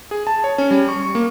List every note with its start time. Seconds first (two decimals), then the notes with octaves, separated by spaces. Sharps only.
0.11 G#4
0.27 A5
0.44 C#5
0.58 C#4
0.71 G3
0.88 C#6
1.02 C#6
1.15 A#3